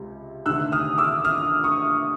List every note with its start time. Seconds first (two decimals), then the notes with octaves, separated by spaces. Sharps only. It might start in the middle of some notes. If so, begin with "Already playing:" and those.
Already playing: C#2 C3
0.46 D2 C3 D#3 E6 F#6
0.72 D#6 F6
0.98 D6 E6
1.25 D#6 F6
1.64 C#6 D#6